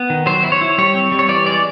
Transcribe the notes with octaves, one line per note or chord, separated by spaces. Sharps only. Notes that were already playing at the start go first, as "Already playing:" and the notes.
Already playing: B3
D#3
F#3 C5
E4
C#5
E4
G3 C#5
C4
G3
C#5
E3 D5
G#3 D5